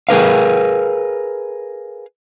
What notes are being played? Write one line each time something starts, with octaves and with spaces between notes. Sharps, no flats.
G#4 A#4 B4 F5